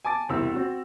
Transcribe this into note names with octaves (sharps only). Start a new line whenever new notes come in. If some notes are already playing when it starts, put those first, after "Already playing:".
G#5 A5 D6 A6
E1 C2 C4 E4 E6
C4 F#4